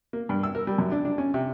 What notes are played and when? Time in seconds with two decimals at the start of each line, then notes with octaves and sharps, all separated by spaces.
0.13 A#3
0.29 G2
0.43 E6
0.55 A#4
0.67 G3
0.78 F#2
0.92 D4
1.05 D4
1.18 C#4
1.34 C3